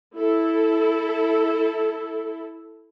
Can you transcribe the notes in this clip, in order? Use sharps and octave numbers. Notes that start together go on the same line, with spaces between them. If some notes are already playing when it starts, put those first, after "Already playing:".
E4 A4